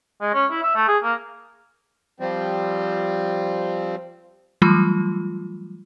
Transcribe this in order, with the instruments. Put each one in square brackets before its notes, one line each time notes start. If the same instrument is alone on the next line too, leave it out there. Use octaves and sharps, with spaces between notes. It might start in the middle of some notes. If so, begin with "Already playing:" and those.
[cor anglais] G#3
C#4
E4
E5
A3
G#4
A#3
[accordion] F3 G3 C4
[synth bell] E3 F#3 G3 A3 F4